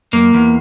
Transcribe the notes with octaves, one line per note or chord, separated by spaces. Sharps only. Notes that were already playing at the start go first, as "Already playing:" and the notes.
F#2 A#3
E2